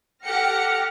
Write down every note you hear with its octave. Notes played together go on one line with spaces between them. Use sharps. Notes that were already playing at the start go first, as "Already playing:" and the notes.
G4 A4 F#5 F6 A#6 C#7